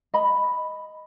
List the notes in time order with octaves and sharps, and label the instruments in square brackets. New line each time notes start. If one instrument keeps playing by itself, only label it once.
[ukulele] D#5 B5